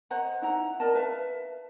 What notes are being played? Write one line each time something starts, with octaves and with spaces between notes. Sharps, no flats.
C5 D#5 F#5 A#5
D#4 E4 F#5 A#5
A#4 D5 D#5 A5
B4 E5 F5 A5